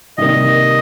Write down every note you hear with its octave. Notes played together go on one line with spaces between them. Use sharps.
C3 D#3 G3 A#3 D#5